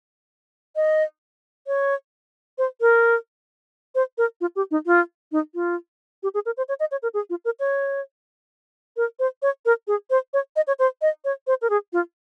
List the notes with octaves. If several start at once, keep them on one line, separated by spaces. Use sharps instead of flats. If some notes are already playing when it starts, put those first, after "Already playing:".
D#5
C#5
C5
A#4
C5
A#4
F4
G4
D#4
F4
D#4
F4
G4
G#4
A#4
C5
C#5
D#5
C#5
A#4
G#4
F4
A#4
C#5
A#4
C5
C#5
A#4
G#4
C5
C#5
D#5
C#5
C5
D#5
C#5
C5
A#4
G#4
F4